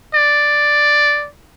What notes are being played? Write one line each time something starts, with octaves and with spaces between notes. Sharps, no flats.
D5